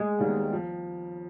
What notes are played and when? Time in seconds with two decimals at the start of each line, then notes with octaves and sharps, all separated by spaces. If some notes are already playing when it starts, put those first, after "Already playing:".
Already playing: G#3
0.19 D#2 D#3 G3 B3
0.52 F3